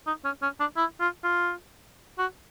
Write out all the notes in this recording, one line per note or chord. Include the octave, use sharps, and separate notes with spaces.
D#4
C#4
C#4
D4
E4
F4
F4
F#4